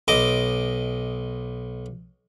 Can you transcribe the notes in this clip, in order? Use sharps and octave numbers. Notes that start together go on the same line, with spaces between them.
B1 D#5 D6